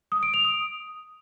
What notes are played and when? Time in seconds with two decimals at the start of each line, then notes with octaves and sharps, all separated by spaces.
0.12 D#6
0.23 D7
0.34 F7
0.45 D#6